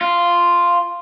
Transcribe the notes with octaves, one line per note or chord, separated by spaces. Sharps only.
F4